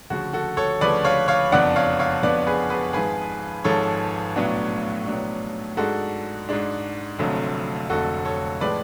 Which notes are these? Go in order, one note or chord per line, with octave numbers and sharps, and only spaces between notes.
D2 C#3 F3 F#4
F#4 A4
A4 C#5
D2 C#3 F3 B4 D5
C#5 F5
C#5 F5
F#1 F2 F3 B3 D4 D5 F#5
C#5 F5
C#5 F5
F#1 F2 F3 B3 D4 B4 D5
G#4 B4
G#4 B4
G#1 G#2 F3 G#4 B4
G#1 G#2 F3 A4 C#5
B1 A2 F#3 B3 D4
B1 A2 F#3 B3 D4
G#2 G#3 D4 F#4 A4
G#2 G#3 D4
F1 F2 D3 F#3 A3
F1 F2 D3 F#3 A3 F#4 A4
A4 C#5
A2 F3 G#3 B4 D5